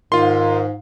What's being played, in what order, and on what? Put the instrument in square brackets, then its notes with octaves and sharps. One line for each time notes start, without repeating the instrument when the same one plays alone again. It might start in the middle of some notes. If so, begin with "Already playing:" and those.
[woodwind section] G#2 [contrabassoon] D#3 [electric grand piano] F4 C6 [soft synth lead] F5